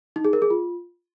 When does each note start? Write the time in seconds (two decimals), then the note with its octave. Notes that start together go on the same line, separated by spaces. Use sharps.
0.16 D#4
0.25 G#4
0.33 A#4
0.42 G#4
0.50 F4